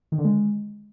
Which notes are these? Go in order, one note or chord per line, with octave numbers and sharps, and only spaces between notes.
D#3
D3
G#3